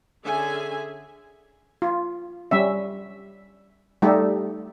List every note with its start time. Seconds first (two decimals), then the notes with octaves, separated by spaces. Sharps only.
0.25 D3 C#4 G#4 E5 G#5
1.82 F4
2.51 G3 C#4 E5
4.02 G3 A3 D#4 G4 A4